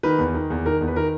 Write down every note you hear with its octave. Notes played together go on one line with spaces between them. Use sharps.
D#3 B4
E2
D#3
E2
D#3 A#4
E2
B4
D#3 A#4